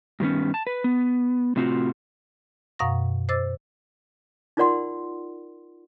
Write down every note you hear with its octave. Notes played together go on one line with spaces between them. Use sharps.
G2 D#3 B3 C#4
A5
B4
B3
A2 C3 C4 F4 F#4
F#2 B2 F5 F#5 C#6 A#6
C5 D#5 D6 E6 A6
D#4 F4 A#4 D5 F#5 C6